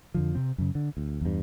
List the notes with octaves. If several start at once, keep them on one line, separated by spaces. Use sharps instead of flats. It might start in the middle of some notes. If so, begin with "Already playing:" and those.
F2 D3 F3
C3 C4
F#2 C#3
D3
D2
E2 G2